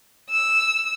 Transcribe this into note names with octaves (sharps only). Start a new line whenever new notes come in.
E6